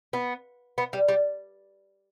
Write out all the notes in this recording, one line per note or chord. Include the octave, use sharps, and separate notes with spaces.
B3
B3
G3
G3